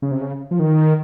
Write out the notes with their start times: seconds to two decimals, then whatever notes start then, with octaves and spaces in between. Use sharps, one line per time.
0.02 C#3
0.11 C3
0.21 C#3
0.51 F3
0.59 D#3